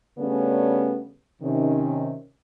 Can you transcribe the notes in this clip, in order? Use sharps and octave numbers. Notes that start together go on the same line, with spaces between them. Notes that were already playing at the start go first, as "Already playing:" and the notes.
C#3 G3 A3 B3 C#4 D4
C3 D#3 C#4